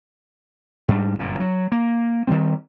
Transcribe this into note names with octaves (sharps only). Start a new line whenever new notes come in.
G#2 G3 D4
G1 F#2 A#2
F#3
A#3
D#3 E3 G3 C4